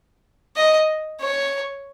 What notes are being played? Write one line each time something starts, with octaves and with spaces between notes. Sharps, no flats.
D#5
C#5